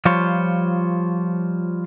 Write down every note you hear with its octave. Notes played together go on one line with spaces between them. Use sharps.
F3 G3 F4 C5 C#5